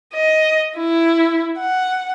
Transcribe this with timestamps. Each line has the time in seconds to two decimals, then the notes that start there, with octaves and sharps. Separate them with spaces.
0.14 D#5
0.77 E4
1.59 F#5